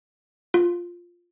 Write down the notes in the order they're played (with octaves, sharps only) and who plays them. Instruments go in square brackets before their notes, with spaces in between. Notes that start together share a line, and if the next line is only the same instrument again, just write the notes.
[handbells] F4